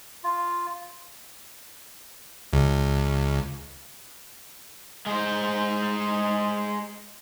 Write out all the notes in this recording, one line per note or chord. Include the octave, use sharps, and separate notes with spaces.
F4
C#2
G#3 C5